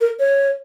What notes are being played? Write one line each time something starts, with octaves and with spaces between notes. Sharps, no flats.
A#4
C#5